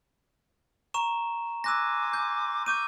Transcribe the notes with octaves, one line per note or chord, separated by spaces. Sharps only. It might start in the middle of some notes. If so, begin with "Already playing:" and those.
A#5 C#6 E7
G#5 C6 D6 E6 F#6 A#6
G6
C#6 D6 E6 G6 D#7